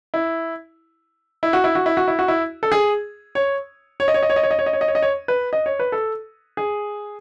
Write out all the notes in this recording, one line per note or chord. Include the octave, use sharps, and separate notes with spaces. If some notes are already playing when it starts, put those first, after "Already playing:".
E4
E4
F#4
E4
F#4
E4
F#4
E4
F#4
E4
A4
G#4
C#5
C#5
D#5
C#5
D#5
C#5
D#5
C#5
D#5
C#5
D#5
C#5
D#5
C#5
D#5
C#5
B4
D#5
C#5
B4
A4
G#4